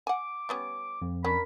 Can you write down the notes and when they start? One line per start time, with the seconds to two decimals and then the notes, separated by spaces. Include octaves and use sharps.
0.07 F#5 G#5 D6
0.49 G3 B3 C#4
1.02 F2
1.24 C#4 D4 A#4 B5